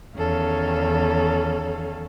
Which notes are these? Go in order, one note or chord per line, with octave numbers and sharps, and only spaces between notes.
E2 D#3 C#4 A4 F5